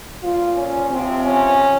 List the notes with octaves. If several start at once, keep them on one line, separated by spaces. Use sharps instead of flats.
A#2 F3 F4
C#4
C3 F3 C4
C#4